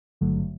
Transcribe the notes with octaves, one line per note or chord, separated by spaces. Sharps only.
G#1 G2 D3 F#3 A3